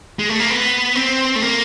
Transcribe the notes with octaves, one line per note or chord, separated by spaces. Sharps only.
G#3
A3
A#3
B3
C4
A3
A#3